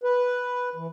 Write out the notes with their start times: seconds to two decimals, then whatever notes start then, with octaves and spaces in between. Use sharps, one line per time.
0.04 B4
0.75 E3